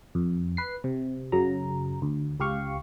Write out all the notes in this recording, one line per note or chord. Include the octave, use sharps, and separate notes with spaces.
F2
B4 C7
C3
F#2 C#3 F#3 A#5
D2
C#2 G4 F5 C#6